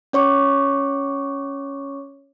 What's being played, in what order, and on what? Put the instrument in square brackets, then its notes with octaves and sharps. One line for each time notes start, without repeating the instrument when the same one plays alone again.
[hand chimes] C#4 C#5 C#6 D6